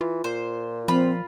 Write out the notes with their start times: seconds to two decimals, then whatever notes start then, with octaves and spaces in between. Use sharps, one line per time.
0.01 E3 F4
0.24 A#2 C5
0.88 F3 C4 F4 B5